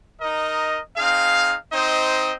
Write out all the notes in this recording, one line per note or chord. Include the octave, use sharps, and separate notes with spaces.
D#4 A#4 D#5
C4 D#4 G#4 F5
C4 D#4 C5 D#5